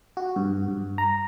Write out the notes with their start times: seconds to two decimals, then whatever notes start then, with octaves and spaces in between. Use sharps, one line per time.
0.17 F#4
0.36 G2
0.68 G2
0.98 A#5